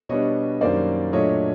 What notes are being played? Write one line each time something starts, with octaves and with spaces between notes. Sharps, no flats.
B2 G3 B3 D4 C#5 D#5
F#2 D#3 G3 A#3 C5 D5
A#2 F#3 A3 D4 C#5 D#5